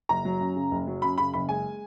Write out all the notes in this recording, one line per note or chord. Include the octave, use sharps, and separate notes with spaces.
F#1 A#5
F#3
F#2
C#3
F#1
F#3
F#2 B5
C#3 B5
F#1 B5
G#3 G#5